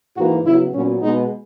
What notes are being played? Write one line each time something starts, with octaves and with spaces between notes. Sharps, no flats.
G#2 E3 A#3 F#4
C#3 F#3 B3 E4
A#2 F#3 B3 C#4
B2 G#3 B3 D#4